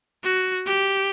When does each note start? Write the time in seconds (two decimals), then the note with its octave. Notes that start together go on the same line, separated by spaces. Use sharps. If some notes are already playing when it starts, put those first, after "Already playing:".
0.24 F#4
0.67 G4